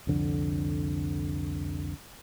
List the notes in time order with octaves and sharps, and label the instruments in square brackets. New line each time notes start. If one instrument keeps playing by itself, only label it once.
[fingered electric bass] C2 F2 D3